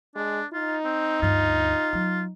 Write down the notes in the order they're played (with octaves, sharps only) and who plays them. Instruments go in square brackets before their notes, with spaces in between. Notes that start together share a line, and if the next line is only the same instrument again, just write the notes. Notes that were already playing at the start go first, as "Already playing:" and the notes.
[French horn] G#3 [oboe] D4
[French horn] D#4 [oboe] F4
[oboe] C4
[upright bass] D2 G2 [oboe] F4
[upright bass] F#3